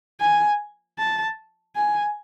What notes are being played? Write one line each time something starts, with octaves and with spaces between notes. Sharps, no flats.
G#5
A5
G#5